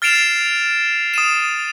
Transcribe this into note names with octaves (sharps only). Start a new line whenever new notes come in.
F6 A6 C7 D7 E7 F7
D#6 D#7 E7